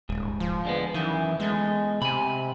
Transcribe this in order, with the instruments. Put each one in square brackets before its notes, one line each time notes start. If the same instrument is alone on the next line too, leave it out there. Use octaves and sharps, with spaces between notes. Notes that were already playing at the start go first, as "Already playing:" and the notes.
[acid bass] D#1 [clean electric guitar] G#2
[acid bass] F3
[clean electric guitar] D3 G#3 B3
[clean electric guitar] F#2 D#3 [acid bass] E3
[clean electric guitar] E2 A3 [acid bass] G#3
[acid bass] C3 [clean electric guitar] G#5 B5